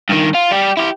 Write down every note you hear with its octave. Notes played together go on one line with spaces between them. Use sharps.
G2 D#3
F4
G3 G4
E4 G4